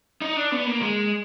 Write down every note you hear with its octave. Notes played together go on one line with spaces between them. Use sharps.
D#4
D4
B3
A#3
G#3